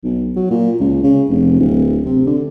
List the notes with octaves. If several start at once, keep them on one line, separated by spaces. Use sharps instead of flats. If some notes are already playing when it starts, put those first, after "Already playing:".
B1
F#3
A#2
C#2
C#3
F1
D1
C3
D3